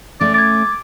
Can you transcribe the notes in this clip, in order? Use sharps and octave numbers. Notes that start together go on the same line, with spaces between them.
A3 C#4 D5
D6 G#6 A6